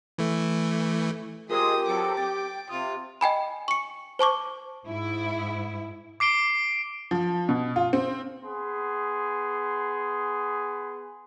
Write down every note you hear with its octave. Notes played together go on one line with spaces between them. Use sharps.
E3 A3
G#3 C4 F4 G4 G#4 A#4 C6 D#6
F#3 C4 A4 D6
G5 A6
C3 F4 D#6
D#5 G5 G#5 B5
C#6 C#7
C5 A5 C#6 D6
G#2 E4
D6 C7 D7 G7
F3
B2
F4
C4
B3 G#4 C6